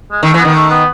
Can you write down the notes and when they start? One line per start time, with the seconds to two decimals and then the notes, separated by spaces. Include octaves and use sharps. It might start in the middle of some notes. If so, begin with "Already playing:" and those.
0.12 G#3
0.22 D#3 A3
0.34 E3 B3
0.45 D#3
0.55 A3
0.70 B3